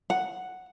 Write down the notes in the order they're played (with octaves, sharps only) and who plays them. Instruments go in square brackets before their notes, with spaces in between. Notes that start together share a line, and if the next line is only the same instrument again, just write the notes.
[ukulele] F#5